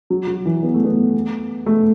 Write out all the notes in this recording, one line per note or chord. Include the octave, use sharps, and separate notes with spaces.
F#3
F#3
E3
B3
A3
B3
A3